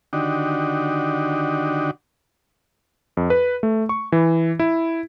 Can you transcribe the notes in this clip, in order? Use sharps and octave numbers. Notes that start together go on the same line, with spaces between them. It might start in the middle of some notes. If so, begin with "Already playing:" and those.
D3 D#3 D4 D#4 F#4 G4
F2
B4
A3
C#6
E3
E4